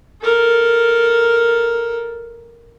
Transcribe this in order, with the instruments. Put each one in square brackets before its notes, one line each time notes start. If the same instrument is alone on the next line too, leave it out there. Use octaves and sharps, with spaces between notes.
[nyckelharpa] A4 A#4